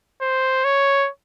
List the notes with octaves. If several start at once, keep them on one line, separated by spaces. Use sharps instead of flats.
C5
C#5